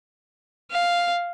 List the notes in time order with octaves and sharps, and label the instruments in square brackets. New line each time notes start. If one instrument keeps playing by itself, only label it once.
[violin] F5